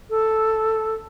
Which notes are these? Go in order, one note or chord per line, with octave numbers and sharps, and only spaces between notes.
A4